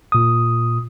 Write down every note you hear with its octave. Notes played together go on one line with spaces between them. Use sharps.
A#2 D#6